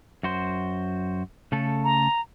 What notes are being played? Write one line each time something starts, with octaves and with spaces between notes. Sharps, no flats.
F#2 F#4 C5
C#3 A3 A4
A#5